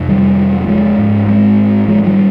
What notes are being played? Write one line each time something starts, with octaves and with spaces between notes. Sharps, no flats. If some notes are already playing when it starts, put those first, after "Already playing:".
Already playing: F2 C3
D#3 G3
G3
F3 G#3
G#2
G#3 C4
F3 G#3
D#3 G3